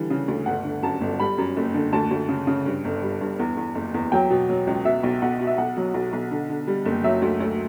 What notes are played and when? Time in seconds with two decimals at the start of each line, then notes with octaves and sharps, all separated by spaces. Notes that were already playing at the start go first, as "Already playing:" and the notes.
Already playing: D3 E3 G3
0.10 C#3
0.28 D2
0.46 G1 F#5
0.64 D3
0.83 F#2 A5
1.01 G1
1.20 G3 B5
1.38 F#2
1.57 F#1
1.74 D3
1.92 D2 A5
2.11 D2
2.29 C#3
2.47 C#3
2.66 G2
2.85 G1
3.02 G3
3.21 G2
3.39 E2
3.57 E2
3.75 F#1
3.94 E2
4.12 F#3 G5
4.30 B2
4.49 F#3
4.67 C#2
4.85 B2 E5
5.03 B1
5.22 B1 F#5
5.40 B2
5.47 E5
5.58 B1 F#5
5.77 F#3
5.94 B1
6.13 B1
6.31 D3
6.49 D3
6.67 G3
6.85 F#1
7.04 F#3 E5
7.22 D2
7.40 D2